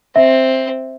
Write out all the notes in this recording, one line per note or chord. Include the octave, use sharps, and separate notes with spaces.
C4 E5